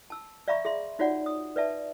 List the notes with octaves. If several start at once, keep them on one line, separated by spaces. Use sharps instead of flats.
A5 E6
D5 E5 F5 A#5 B5 C#6
G#4 E5 C6
D#4 F4 F#4 C#5 D5 F#5
D#6
B4 D5 E5 A5